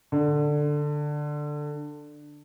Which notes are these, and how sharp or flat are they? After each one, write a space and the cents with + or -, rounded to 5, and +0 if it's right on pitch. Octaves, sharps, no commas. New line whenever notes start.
D3 +10